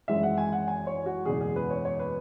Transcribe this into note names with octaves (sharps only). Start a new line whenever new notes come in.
G#1 F#2 E3 G#3 E5
F#5
G#5
F#5
G#5
C#5
F#4
F#1 E2 B2 G#3 G#4
G#4
B4
C#5
C#5
B4